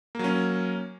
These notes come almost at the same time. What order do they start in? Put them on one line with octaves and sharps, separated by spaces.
A#3 F#3 C#4